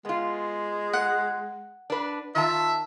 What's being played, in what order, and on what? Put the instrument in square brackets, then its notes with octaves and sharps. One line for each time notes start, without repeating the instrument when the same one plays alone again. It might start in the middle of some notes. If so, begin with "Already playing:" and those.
[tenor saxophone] G#3 [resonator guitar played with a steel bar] B3 F4
[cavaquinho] F#5
[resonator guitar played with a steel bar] D4 B4
[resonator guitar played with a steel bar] D#3 A5 [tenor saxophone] F4 [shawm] E5